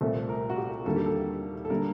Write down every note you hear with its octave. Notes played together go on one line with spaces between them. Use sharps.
C2 A#2 A3 C4 A4
A#4
F#4
G4
D#2 D3 G3 A#3 A4
G4
A4
A4
D3 G3 A#3 A#4